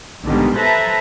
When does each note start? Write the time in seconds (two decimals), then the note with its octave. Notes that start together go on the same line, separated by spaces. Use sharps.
0.22 A#1 G#2 B2 D3 D#3 G3
0.56 A4 B4 C5 E5 A5 A#5